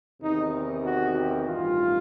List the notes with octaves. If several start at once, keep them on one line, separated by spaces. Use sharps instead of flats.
E2 C3 D#3 D#4
F#4
G4
A1 G2 D#3 F4